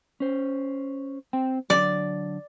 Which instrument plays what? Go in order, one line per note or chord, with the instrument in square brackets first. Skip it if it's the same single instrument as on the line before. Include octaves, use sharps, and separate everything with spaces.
[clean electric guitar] C#4 C5
C4 C5 G5
[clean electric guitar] D3 F#3 [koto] D5